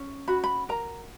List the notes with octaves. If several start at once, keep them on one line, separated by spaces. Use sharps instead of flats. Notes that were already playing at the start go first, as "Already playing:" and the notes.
Already playing: C#4
F#4 B5
B5
A#4 A#5